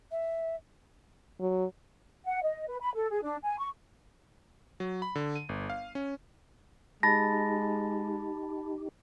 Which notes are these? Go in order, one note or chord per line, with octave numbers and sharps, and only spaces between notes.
E5
F#3
F#5
D#5
B4
B5
A4
G#4
D4
G#5
C#6
F#3
B5
D3
D#7
G1
F5
C#4
G#3 D#4 G4 A5 B5 A6 A#6